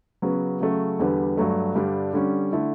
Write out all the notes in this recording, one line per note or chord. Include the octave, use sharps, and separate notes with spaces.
C#3 F#3 B3
C#3 F#3 A3
E2 D3 G3 B3
G2 F#3 A3
G2 D3 G3 D4
D3 G3 C#4
D3 A3 E4